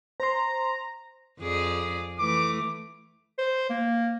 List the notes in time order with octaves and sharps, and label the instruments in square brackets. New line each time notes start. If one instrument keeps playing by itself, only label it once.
[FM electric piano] C5 C6 [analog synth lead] A#5
[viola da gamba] F2 G#4 D5
[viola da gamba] E3 A3 [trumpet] D6
[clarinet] C5
A#3